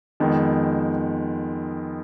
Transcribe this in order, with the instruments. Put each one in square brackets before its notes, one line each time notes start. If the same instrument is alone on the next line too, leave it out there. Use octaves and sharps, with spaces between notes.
[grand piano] F2 D#3 G#3 B3